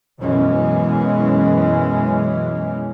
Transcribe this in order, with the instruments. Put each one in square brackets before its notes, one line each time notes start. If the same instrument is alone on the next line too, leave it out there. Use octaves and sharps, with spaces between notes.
[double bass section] F#2 B2 E3 G#3 C#4